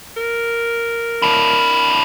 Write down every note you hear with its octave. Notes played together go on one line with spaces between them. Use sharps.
A#4
D4 E4